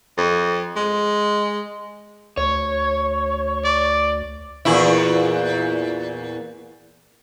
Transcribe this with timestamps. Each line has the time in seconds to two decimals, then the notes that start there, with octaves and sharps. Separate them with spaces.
0.18 F2
0.76 G#3
2.37 D2 C#5
3.64 D5
4.65 E2 A#2 E4